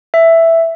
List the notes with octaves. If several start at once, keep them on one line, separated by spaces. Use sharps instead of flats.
E5